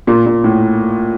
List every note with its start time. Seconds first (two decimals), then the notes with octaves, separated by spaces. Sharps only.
0.07 A#2
0.26 A#2
0.44 A2